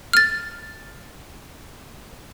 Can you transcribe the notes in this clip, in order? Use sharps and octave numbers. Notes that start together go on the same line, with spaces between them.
F6 A6